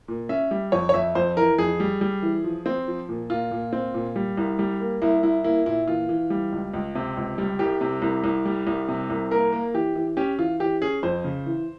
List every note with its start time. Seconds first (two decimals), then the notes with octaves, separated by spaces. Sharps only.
0.08 A#2
0.29 C#4 E5
0.51 G3
0.72 F2 C#5
0.89 C#5
0.94 F2 E5
1.15 F2 C5
1.37 E3 A#4
1.58 F2 G#4
1.80 G3
2.01 G3
2.22 E3
2.44 F3
2.66 C4
2.88 F3
3.09 A#2
3.30 A#2 F4
3.51 A#2
3.73 C4
3.94 A#2
4.16 G3
4.37 C2
4.59 G3
4.81 A#3
5.02 C2 E4
5.23 C2 E4
5.44 A#3 E4
5.66 A#2 E4
5.88 E3 F4
6.09 E3
6.30 G3
6.52 C#2
6.74 C#2
6.95 C3
7.17 C#2
7.38 G3
7.59 C2 G4
7.81 C3
8.02 C2
8.24 C2
8.45 G3
8.67 C2
8.88 C3
9.10 C2
9.31 A#3 A#4
9.53 A#3
9.74 E3 G4
9.95 E3
10.17 C#4 G4
10.39 E3 F4
10.60 E3 G4
10.81 C#4 G#4
11.03 F2 C5
11.24 C#3
11.46 E3